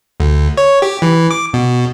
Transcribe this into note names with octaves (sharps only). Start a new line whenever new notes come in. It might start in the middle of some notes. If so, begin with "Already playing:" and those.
D2
C#5
G4
E3
D6
B2